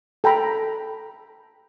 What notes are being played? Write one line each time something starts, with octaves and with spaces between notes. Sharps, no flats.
A4 G5 A#5 B5